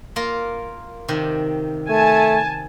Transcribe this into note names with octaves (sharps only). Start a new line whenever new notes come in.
A#3 F4 A#4
C3 D#3 G4
A3 G#5 A5